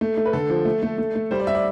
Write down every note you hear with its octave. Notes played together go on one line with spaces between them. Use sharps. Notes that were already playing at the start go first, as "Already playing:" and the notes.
A3
A3
B4
D3 A4
F3
A3
A3
A3
A3
G3 C5
D5
G3 E5
D5